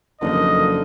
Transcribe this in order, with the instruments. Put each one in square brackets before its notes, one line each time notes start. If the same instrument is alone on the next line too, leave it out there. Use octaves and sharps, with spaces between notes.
[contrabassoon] F#1 [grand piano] F2 D#3 [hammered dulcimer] D3 A#3 A#4 [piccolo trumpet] D#5